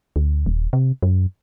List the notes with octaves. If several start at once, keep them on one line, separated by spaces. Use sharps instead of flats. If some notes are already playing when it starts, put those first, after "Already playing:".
D2
D#1
C3
F#2